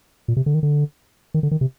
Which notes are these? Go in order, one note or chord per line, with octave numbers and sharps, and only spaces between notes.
A#2
C3
D3
D#3
D3
D#3
D3
D#3
C3